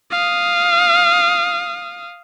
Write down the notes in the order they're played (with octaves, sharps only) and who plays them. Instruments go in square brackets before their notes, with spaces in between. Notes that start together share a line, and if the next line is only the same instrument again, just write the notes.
[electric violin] F5 D#6